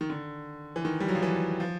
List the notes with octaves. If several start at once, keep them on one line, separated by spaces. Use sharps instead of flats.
D#3
D3
E3
D#3
G3
F#3
F3
E3
F3